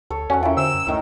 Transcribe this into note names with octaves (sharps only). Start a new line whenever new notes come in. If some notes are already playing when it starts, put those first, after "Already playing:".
D2 A4 C#5
E2 C#4 F#4 F#5
C#4 E4 F4 A#4 G5
D3 C5 E6
F#2
D2 A2 D#3 A#5